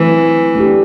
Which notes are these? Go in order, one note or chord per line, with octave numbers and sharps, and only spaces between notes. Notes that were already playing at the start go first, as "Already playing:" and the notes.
Already playing: E3 F#3 A3 C4
A3 D4 G4